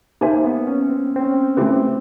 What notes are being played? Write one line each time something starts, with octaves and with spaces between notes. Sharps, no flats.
A#3 D#4 G4 C5 E5 G#5
B3
C#4
C4
C4
C#4
A3 C4 C#4 E4 G4 B4